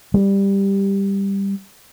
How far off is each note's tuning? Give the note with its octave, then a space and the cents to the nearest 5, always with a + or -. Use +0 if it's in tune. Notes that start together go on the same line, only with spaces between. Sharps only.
G3 +10